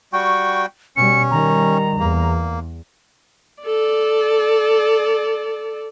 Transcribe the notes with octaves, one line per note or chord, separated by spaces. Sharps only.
G3 F#4 G5 C#6
B2 G3 C#4 C#7
D#3 G3 A#5
E2 A#3
A4 D5